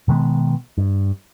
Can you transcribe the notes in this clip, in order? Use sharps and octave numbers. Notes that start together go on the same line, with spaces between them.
B2 D#3 G#3 B3
G2